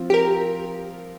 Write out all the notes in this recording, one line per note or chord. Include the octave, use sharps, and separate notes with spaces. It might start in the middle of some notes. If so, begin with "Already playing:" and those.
Already playing: F3 C4 F4
G4
A#4